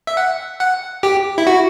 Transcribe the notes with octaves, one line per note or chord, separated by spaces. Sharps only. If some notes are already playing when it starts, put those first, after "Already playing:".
E5
F#5
F#5
G4
E4
F#4